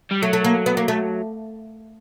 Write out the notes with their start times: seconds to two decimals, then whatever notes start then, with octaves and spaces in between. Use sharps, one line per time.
0.11 G3
0.22 F#3 A3
0.33 A3
0.44 A#3
0.66 B3
0.77 A#3
0.88 A3